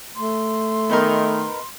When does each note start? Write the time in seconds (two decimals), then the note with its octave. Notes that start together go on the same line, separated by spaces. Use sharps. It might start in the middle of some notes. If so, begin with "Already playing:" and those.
0.16 A3 C6
0.90 D#3 B3 D#4 A#4